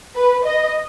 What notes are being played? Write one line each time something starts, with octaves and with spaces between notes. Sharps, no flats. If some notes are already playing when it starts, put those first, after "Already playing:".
B4
D#5